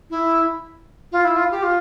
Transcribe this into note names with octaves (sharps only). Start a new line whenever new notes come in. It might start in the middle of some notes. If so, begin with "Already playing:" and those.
E4
F4
E4
F4
G4
F4